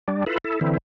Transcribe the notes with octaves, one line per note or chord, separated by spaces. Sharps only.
G3 D4
E4 F4 A4 B4
E4 A4
D3 E3 C4 E4